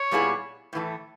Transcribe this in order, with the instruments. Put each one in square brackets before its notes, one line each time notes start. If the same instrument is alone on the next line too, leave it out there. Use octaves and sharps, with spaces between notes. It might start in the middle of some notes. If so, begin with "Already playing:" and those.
Already playing: [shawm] C#5
[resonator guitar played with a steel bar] A#2 G3 B3 E4 G#4
A2 E3 A3